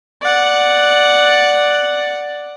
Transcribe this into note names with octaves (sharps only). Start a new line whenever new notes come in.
D5 F#5